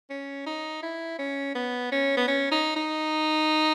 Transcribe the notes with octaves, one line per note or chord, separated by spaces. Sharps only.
C#4
D#4
E4
C#4
B3
C#4
B3
C#4
D#4
D#4